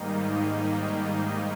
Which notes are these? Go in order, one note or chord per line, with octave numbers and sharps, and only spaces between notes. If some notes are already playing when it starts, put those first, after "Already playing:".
Already playing: G#2 D#3 G3 A#3 D#4